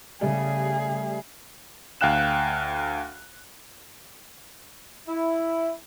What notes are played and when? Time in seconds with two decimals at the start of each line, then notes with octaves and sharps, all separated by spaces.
0.21 C#3 G3 A3 G#4
2.01 D2 F5 G5 F#6 E7
5.08 E4